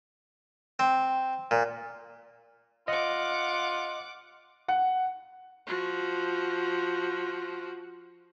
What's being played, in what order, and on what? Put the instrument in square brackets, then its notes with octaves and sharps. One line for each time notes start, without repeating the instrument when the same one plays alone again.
[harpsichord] C4
A#2
[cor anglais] F4 [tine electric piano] D#5 [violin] F#5 D6
[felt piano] F#5
[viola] F3 F#4